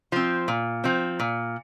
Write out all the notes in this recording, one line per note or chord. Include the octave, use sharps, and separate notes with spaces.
F3 C4
A#2
F3 C4
A#2